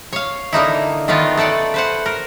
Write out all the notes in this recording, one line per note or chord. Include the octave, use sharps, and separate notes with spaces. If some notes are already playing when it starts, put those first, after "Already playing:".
C#5 F5
D3 A#3 D#4 E4
D#3 A3 B3 F4 D#5
A3 A4 D5 F#5
B4 C5 F#5
A#4